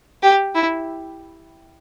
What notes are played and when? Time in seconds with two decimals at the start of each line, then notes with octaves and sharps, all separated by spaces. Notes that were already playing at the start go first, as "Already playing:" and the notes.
0.23 G4
0.55 E4